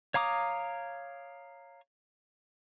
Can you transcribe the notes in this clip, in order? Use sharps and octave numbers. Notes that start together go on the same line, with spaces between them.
C#5 F5 A#5 D6 D#6